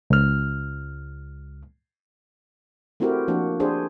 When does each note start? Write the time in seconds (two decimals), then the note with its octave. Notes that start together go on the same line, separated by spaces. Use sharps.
0.10 C#2 F6
3.00 A3 C4 E4 F#4 G4 A#4
3.28 F3 A#3 D4 F#4
3.60 D4 G4 G#4 C5